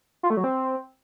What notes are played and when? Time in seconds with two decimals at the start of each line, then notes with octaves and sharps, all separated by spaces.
0.23 F4
0.30 A3
0.37 F#3
0.44 C4